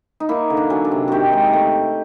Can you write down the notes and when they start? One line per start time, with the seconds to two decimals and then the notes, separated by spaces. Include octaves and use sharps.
0.20 D#4
0.29 A#3 E4
0.50 D3
0.57 D4
0.70 F#3 C#4
0.85 D4
0.91 C3
1.08 D#3 F#4 G4
1.33 G#3
1.53 A3